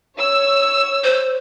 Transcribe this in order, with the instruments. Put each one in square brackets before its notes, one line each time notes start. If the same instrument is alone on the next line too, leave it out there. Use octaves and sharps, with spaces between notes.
[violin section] C#5 E6
[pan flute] C5